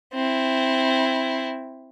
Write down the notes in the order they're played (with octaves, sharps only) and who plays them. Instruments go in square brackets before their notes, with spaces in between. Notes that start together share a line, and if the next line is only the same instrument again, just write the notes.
[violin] C4 E4